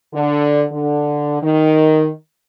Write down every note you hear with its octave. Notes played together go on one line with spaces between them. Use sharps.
D3
D3
D#3